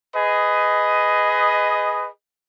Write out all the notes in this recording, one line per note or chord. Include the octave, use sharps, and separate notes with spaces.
G#4 B4 D#5